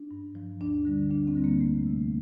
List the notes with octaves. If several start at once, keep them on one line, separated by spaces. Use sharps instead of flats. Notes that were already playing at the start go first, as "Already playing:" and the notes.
Already playing: D4
G2
F3
D2 D4
D3 G3
D2 D4
C4
D3 G3
A#3
E2 A3
C3 F3